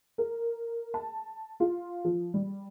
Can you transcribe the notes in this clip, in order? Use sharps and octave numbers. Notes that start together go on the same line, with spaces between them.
A#4
A5
F4
F3
G3